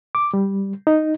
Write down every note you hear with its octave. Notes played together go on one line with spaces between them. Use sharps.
D6
G3
D#4